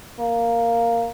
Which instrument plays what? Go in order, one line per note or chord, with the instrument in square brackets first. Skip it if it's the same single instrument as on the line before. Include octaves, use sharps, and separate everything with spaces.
[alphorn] A#3